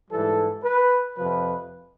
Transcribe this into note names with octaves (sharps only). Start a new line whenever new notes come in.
G#2 E3 G3 A4
B4
F2 C3 F3 B4